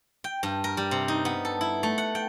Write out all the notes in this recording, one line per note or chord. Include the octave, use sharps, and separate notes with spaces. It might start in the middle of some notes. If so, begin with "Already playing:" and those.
G5
G2
A#4
G3
C3
D#4
B3
A4
E4
A3
F#5
G5